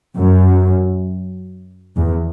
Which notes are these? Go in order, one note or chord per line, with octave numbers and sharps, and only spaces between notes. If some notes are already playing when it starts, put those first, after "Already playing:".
F#2
E2